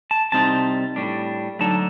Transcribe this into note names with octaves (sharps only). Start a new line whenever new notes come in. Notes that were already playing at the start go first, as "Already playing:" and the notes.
A5
C2 C3 G3 C4 D#4 A5
A2 G3 D4
D2 D3 F#3 D#4 A5